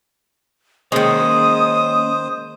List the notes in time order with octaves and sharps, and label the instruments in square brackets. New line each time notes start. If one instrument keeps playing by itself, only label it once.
[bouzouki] D#3 G#3 [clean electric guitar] A#3 C#4 C#5 [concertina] C5 [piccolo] D#6